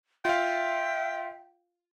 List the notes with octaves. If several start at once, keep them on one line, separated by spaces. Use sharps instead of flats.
F4 E5 F5 G5